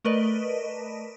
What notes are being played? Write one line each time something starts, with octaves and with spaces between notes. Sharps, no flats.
A3 A#4 B4 D5 D#5